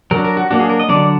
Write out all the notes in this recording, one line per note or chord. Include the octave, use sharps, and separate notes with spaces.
F#3 D4 A#4
A#4
F#4
F#3 A#3 D4 F#4
G#4
A#4
D#5
D3 F#3 D4 D5